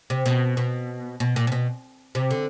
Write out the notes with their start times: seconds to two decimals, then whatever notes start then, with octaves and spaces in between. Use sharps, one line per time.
0.10 C3
0.26 B2
0.57 B2
1.20 B2
1.36 A#2
1.47 C3
1.52 B2
2.15 C3
2.31 D3